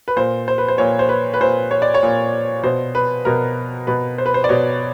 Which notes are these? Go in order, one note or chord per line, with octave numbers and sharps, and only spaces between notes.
B4
A#2 C5
C5
B4
C5
A#2 C#5
C5
B4
B4
A#2 C5
C#5
D5
C#5
A#2
B2 C5
B4
B2 A#4
B2 B4
C5
B4
C5
D5
B2 C#5